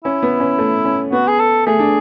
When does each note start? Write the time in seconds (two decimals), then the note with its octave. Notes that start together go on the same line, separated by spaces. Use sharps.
0.04 C#4 E4
0.23 B3
0.40 C#4
0.58 A3
0.85 C#4
1.12 B3 F#4
1.28 G#4
1.40 A4
1.66 A3 G#4
1.79 D4